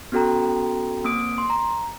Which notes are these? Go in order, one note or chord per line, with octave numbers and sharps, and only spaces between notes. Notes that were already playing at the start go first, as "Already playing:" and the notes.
B3 C#4 F#4 A4 G5 A#5
A#3 C4 D#6 D7
C6
A#5